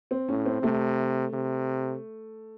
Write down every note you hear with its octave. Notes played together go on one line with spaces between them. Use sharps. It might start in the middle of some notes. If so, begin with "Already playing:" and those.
C4
A2 C#4
C4
C3 A3
C3